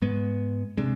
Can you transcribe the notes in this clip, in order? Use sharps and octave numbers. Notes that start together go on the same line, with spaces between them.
G#2 G#3 B3
C3 G#3 D4